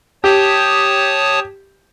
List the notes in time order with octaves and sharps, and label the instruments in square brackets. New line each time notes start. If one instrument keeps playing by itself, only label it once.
[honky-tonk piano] G4 [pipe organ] C#5 A5 D#6